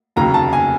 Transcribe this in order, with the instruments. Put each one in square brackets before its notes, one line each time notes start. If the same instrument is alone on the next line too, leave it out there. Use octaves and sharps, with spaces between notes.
[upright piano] F1 D#2 C#3 F#3 A#5
A5
G#5